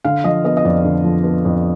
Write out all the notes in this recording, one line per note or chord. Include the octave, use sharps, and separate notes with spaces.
D3 F5
F3 D#5
B3 D#5
D#5
F2 D5
D3
F3
B3
F2